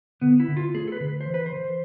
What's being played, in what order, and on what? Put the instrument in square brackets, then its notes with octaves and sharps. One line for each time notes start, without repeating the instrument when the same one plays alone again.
[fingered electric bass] D3 [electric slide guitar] B3
[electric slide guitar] E4
[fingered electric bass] D3
[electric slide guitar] F4
[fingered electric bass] A3 [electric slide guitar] G#4
[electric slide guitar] A4
B4
[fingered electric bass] D3
[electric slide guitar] C5
[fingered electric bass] E3
[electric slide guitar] B4
C5
[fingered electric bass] E3